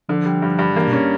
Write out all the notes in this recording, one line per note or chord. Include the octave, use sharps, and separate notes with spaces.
D3 F3
G3
G2
G2
E3 A#3
B2
C#4